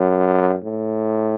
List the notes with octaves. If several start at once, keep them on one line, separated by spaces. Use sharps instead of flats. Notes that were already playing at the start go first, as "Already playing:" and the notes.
Already playing: F#2
A2